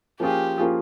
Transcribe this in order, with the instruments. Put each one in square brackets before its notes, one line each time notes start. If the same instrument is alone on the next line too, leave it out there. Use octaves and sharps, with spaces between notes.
[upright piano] F3 A#3 C#4 F4 G#4 [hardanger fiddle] G4
[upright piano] F3 A#3 C#4 F4 G#4